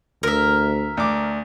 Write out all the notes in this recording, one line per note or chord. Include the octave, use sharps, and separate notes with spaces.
D2 A#4 E5
D2 D6